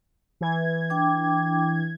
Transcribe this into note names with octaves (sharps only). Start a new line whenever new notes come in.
E3 G#6
D4 G5 D6